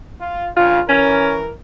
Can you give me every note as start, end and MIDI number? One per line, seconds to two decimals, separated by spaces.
0.21 0.49 65
0.57 0.80 43
0.57 0.80 49
0.57 0.82 65
0.89 1.52 52
0.89 1.38 61
0.89 1.52 70